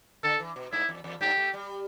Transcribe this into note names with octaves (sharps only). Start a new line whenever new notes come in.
D3 A4
E3
B2
G2 E4
E2
E2
G2 G4
A3
G3